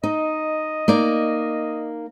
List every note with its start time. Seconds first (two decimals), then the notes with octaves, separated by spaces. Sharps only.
0.04 D#4 D#5
0.88 A#3 D#4 D5